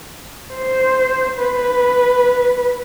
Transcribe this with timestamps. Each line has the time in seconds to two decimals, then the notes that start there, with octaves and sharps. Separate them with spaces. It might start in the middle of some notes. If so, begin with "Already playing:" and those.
0.55 C5
1.39 B4